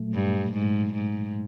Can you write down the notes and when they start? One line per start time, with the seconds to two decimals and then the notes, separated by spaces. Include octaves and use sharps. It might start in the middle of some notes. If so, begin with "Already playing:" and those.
Already playing: A#2 F#3 A3
0.14 G2
0.54 G#2
0.94 G#2